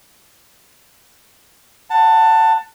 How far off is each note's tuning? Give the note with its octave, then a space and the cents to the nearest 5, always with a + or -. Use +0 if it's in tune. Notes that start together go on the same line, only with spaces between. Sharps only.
F#5 +0 A5 +20